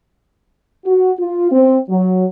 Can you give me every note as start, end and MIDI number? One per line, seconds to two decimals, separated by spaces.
0.85 1.12 66
1.19 1.51 65
1.52 1.78 60
1.89 2.25 54